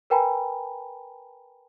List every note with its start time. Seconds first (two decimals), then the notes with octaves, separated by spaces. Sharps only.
0.10 A#4 B4 G5 G#5 A#5 B5